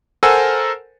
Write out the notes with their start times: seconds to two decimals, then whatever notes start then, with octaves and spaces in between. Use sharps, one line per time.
0.23 A4 A#4 C5 F#5 G#5 E6